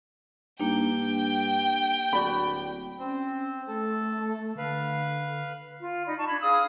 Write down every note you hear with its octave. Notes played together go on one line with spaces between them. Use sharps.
G2 A#3 D4 D#4 G5
D1 F#4 D5 B5
C4 C#4
A3 A4
D3 B4 F5
F4
D#4 D5 B5
A5 C#6
D4 B5 G#6
G#4 F5 D#6 E6